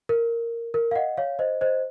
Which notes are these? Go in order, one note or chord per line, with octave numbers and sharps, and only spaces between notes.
A#4
A#4
F5
D#5 F#5
C#5 F5
C5 D#5
C5 D#5